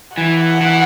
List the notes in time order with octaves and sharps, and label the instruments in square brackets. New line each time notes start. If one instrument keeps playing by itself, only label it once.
[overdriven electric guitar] E3 [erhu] F#5
[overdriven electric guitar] E3